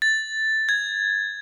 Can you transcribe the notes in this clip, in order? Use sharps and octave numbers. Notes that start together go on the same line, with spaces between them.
A6
G#6